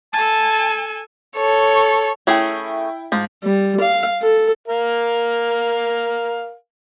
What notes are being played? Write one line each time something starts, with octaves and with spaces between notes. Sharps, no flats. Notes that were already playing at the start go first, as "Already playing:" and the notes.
A4 G#5 A5
A4 C#5
A3 C#4 E4 G#4 G5
G#2 F3
G3
F5
A4
A#4 F5